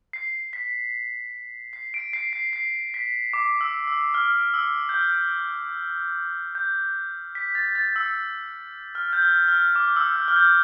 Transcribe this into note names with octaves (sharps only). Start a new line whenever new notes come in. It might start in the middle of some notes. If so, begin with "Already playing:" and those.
C7
B6
C7
D7
C7
C7
C7
B6
D6
E6
E6
F6
E6
G6
F6
G6
B6
A6
A6
E6
F6
G6
F6
F6
D6
E6
F6
F6
G6